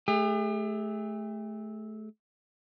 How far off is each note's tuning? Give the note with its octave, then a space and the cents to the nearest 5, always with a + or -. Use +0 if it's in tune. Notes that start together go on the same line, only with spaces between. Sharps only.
A3 -20 G4 +45